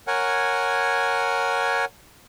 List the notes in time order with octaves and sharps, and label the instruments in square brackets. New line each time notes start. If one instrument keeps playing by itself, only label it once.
[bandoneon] A#4 C#5 F#5 G#5